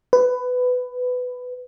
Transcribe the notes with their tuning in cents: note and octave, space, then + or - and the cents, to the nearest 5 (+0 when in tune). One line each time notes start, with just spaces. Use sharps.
B4 +15